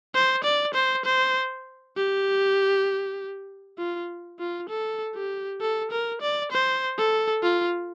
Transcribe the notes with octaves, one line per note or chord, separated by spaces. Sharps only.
C5
D5
C5
C5
G4
F4
F4
A4
G4
A4
A#4
D5
C5
A4
F4